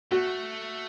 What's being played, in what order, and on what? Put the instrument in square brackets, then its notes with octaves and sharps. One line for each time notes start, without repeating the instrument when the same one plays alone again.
[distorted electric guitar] A3 [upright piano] F#4